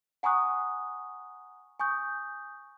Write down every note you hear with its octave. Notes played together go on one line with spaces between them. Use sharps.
F#5 G#5 A#5 C#6 D#6 F#6
G#5 C#6 D#6 G6